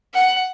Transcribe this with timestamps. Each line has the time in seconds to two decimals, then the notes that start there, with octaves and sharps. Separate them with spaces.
0.14 F#5